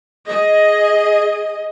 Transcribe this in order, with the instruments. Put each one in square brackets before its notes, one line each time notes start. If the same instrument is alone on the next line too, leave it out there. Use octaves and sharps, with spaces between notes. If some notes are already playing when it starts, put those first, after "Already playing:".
[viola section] G#4 D#5